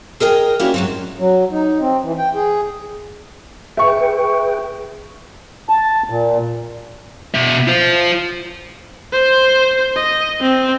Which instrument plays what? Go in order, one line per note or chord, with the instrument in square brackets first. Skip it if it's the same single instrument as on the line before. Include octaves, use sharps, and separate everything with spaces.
[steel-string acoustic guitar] G#4 A#4 D#5 G5
A#3 C#4 D4 E4 F#4 G4
G#2 F#3 C4
[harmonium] F#3
D#4
C4
E3
G5
G#4
[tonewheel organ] G#4 B4 G5 [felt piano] E5 C#6
[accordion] A5
A#2
[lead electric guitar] B2 E5
F4 C5
[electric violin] C5
D#5
C4